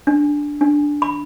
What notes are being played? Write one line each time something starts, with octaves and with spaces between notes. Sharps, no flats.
D4
D4
B5